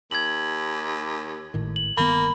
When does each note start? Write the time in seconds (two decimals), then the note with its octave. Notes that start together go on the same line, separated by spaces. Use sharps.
0.11 D#2 G#6 F#7
1.54 G#1 A2 D#3
1.76 F#7
1.97 G1 D#3 A#3 B3 B5